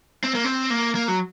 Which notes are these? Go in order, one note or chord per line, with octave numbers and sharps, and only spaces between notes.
C4
A#3
C4
A#3
A#3
F#3